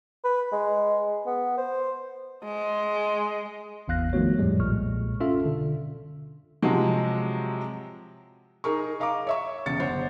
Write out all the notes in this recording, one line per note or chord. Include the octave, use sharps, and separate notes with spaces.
B4
G#3
B3
C5
G#3
G#1 E2 F5 F#6 A#6
D#3 F3 A3 B3 F#4 C#5
F2 A2 F3 G3 G#3
B1 A#2 G#3 C#6 F6
C#4 F4 A4 E5
B2 D3
C3 F3 F#3 G#3
D#4 G#4 A#4 C#6
D#5 F5 A#5 C#6 D6
C#5 E5 C#6
E1 E2 C#3 A6 C#7
G1 C5 C#5 F#5